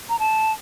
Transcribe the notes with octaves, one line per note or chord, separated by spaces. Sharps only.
A#5
A5